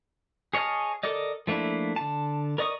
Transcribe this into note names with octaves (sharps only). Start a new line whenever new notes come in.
G#4 C#5 D#5 A5 F6
A4 A#4 D5 D#5
F3 A3 A#3 D4 E4
D3 A5
A#4 D5 D#5 C#6 D#6